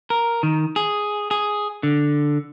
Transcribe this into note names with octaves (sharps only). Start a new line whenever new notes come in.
A#4
D#3
G#4
G#4
D3